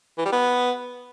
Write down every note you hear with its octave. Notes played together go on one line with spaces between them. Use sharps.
E3
G3
B3